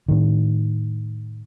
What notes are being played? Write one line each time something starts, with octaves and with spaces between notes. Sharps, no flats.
A2 D#3